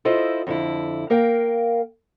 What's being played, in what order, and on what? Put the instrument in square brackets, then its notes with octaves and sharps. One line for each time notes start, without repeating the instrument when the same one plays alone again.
[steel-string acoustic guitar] E4 F4 A4 C5 D#5
F2 D3 E4
A#3 A#4 F5 G5